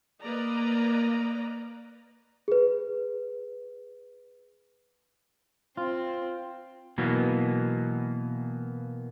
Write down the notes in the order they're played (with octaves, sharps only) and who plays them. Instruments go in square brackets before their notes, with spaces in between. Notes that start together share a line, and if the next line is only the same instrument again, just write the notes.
[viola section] A#3 B4 D5 D#5 A#5
[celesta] G#4 B4
[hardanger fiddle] C4 [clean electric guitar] F4
[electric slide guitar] B2 E3 F#3 A#3 B3